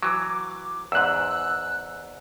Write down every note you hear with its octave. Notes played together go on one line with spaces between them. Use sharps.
E3 F#3 D6
E2 G#2 E6 F#6